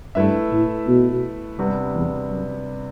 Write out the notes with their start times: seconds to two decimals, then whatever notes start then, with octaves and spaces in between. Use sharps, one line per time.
0.15 G2 A3 E4 B4 E5
0.51 A2
0.87 B2
1.58 G2 C3 G3 B3 D4
1.94 E2
2.30 F#2